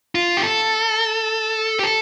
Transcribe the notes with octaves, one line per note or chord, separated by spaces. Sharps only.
F4
G4
A4
G4
A4